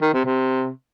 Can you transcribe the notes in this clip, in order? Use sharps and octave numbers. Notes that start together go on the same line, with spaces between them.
D#3
C3
C3